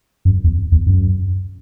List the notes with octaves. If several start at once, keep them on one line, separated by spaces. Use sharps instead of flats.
F#2
E2
E2
F#2